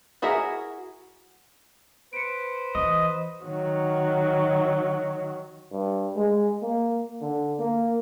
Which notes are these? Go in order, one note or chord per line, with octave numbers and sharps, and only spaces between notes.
E4 F#4 G#4 A#4 E5
B4 C5 C#7 D7
E3 D#5
D#3 F#3 F#4
G2
G#3
A#3
D3
A#3